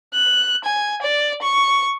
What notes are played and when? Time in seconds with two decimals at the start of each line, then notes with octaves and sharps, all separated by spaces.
0.14 F#6
0.64 G#5
1.02 D5
1.42 C#6